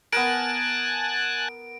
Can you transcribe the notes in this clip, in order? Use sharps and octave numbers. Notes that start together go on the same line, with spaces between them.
B3 A#4 G#5 A5 F#6 D7